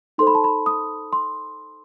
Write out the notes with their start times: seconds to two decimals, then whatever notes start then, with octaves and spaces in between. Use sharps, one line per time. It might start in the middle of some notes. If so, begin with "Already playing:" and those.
0.18 D#4 A4 C5 C6
0.27 B5
0.35 A5
0.44 B5
0.66 D#6
1.13 C6